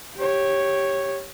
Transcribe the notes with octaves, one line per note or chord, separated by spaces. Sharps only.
G4 C#5